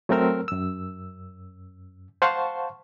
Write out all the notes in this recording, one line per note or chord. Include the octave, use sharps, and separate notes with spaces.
F#3 A3 C4 A#4 E6 F6
F#2 E6
C5 F5 F#5 A5 C6 C#6